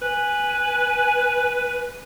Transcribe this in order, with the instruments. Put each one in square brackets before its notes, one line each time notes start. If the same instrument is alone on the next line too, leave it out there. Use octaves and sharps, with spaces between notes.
[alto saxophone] B4 [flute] G#5